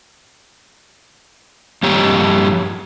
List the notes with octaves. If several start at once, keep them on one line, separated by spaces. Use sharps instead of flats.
G2 F3 G4 C#5